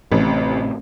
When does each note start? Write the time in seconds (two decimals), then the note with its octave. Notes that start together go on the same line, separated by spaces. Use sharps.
0.12 A1 A2 C3